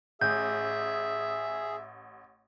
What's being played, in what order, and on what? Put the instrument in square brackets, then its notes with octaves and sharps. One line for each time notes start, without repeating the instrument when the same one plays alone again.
[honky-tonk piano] A1 [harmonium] G#4 [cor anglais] E5 [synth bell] G6